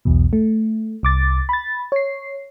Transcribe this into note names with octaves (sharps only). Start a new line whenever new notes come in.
B1 E2 B2
A3
C2 D6 A6
B5 A6
C#5 C7